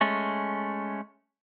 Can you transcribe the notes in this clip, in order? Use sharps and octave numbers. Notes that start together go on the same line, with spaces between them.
G#3 A3 C#4